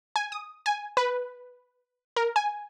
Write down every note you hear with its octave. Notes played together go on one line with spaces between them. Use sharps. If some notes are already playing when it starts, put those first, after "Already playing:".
G#5
D#6
G#5
B4
A#4
G#5